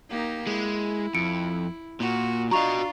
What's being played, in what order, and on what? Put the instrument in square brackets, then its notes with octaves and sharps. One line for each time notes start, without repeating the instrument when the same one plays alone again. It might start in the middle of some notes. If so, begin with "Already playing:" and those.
[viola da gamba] A#3 D#4 G4
[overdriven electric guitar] G#3 [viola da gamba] E4
[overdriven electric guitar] F2 [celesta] C#7 D7
[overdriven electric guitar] A#2 [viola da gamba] F#4
[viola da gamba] D4 F4 [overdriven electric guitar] F#4 D#5 [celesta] A#5 C#6 F7